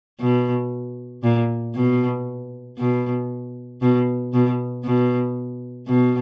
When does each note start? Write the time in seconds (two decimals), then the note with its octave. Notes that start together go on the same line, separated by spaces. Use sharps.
0.20 B2
1.23 A#2
1.75 B2
2.78 B2
3.81 B2
4.33 B2
4.85 B2
5.87 B2